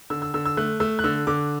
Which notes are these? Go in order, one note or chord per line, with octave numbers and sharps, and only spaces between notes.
D3 E6
E6
D3 E6
E6
A3 F#6
A3 E6
F#6
D3 E6
D3 D6